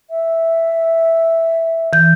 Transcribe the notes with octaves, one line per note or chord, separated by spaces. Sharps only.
E5
E3 G6